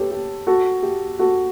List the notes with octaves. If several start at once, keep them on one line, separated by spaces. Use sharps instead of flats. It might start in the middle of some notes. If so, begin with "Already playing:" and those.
Already playing: G4 A4 B4 C#5
G4
F#4 A4
G4
F#4 A4